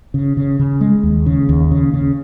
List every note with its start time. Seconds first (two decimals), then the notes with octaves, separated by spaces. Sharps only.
0.14 C#3
0.37 C#3
0.59 C#3
0.81 G#3
1.03 D#2
1.26 C#3
1.49 D#2
1.71 C#3
1.94 C#3